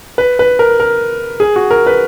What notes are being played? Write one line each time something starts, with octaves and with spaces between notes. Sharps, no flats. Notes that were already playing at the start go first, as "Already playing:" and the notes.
B4
B4
A#4
A#4
G#4
F#4
A#4
B4